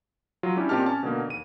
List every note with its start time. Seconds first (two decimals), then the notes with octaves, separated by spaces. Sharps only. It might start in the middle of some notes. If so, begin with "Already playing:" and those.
0.43 F#3 F4
0.56 G3 C#4 D4 E4 G4
0.69 A#2 C4 G4 D#5 A5 F6
0.86 C#4 A5
1.03 B2 D3 A#3
1.28 D#2 D#7